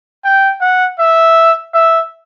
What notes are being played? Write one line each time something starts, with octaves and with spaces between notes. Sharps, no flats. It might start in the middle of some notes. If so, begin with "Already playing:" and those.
G5
F#5
E5
E5